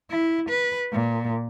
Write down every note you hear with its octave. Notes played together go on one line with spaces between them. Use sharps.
E4
B4
A#2